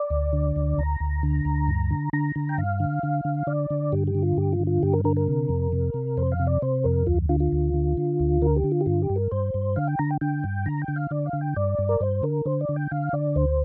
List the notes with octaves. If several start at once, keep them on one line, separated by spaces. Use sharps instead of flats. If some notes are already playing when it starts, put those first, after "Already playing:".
Already playing: D5
D2
D3
D2
D2 A#5
D2
D3
D2
G2
D3
D3 A#5
D3
G5
G2 F5
D3
D3
D3
D3 D5
D3
G2 G4
G4
D3
F4
G2 G4
F4
D3
F4
G2 G4
A#4
D3 A#4
A#4
C3
F2
C3
C3
F2 C5
F5
C3
D5
C3 C5
F2 A#4
D2 F4
D3 F4
F4
D2
D3
D3
D2
D3 A#4
G4
D3
F4
G4
G2 F4
G4
G2
A#4
G2 C5
G2
D3 F5
G5
D3 A#5
G5
D3 G5
G2
D3 A#5
G5
D3
F5
D3 D5
F5
D3
G5
G2 D5
G2
A#4
G2 C5
D3 A#4
D3 C5
D5
D3
G5
D3 F5
D3 D5
D2 C5